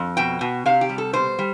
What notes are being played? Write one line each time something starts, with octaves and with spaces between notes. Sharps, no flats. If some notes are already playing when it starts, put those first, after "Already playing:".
Already playing: F2
B2 G5
B2
C3 F5
G4
G3
A4
B2 C5
G3